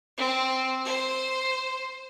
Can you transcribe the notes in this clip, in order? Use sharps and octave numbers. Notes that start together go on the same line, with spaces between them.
C4
C5